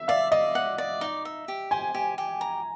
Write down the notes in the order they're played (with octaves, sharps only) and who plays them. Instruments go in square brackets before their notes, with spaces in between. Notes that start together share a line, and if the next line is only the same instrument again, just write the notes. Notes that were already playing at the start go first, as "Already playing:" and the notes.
Already playing: [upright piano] E5
[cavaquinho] D5 [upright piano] F5
[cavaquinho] D5 [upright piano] D#5
[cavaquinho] F#5
D5
D#4
E5
G4
[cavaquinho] C5 [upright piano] G#5
[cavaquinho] G4
G4
A#5